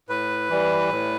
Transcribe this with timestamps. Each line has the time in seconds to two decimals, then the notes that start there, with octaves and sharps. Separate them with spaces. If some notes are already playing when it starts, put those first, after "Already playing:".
0.09 A2 B4
0.50 E3 G3
0.91 A2